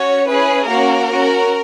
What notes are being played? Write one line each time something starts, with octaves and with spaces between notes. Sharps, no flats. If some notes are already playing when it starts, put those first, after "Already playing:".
Already playing: C#4 F#4 C#5
C#4 E4 G#4 B4
A#3 C#4 F#4 A#4
C#4 F#4